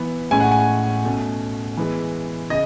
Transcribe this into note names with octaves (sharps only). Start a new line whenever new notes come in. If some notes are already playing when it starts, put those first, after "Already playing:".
Already playing: E3 B3
A2 G#3 C#4 G#5
F#5
G#5
B2 A3 C#4
E3 G#3 B3
C#3 D#5